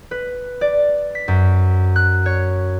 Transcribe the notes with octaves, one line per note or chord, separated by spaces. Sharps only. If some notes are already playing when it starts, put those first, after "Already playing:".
B4
D5
B6
F#2
F#6
C#5